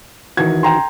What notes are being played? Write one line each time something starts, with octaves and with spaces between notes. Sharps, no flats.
D#3 E3 F#4 G#6
G5 A#5 C6